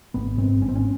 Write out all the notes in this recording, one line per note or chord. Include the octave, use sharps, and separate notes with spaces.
G#1 B3
G#2 C4
G#1 C#4
C4
C#4